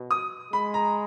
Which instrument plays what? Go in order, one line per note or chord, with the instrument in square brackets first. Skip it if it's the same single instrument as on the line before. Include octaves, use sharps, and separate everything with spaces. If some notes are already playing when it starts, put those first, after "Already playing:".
Already playing: [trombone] B2
[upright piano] D#6
[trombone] G#3 [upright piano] B5
[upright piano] A#5